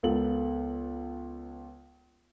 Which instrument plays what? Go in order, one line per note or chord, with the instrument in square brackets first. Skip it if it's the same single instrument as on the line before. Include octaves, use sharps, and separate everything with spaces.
[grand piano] C#2 B3 A4 A#4 F#7